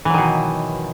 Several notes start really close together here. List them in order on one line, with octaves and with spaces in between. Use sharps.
E3 F#3 D#3 B2